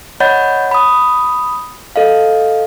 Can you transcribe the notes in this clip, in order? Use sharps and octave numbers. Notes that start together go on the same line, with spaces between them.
C#5 D#5 F#5 B5 G6 A6
B5 D#6
A4 D#5 F5